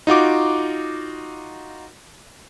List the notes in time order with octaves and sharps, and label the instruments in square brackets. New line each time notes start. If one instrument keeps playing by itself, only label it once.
[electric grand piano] D#4 F4 F#4 D6